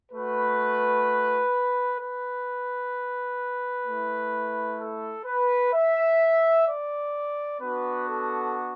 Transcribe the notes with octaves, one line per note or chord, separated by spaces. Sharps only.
A3 F#4 B4
B4
A3 E4
A4
B4
E5
D5
B3 D4 F#4 B4
A4